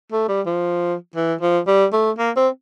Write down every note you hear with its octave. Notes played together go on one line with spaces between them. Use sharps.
A3
G3
F3
E3
F3
G3
A3
A#3
C4